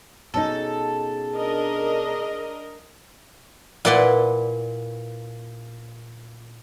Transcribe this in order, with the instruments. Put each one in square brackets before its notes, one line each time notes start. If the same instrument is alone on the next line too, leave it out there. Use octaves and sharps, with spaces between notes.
[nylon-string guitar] B2 C#4 D#4 [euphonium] G#4 [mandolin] A4
[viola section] D4 A#4 D#5
[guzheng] A#2 E4 B4 D5 F#5 C6